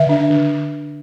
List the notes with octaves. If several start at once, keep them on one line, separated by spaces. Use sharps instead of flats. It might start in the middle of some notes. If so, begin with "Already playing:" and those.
Already playing: D3 E5
D4
D3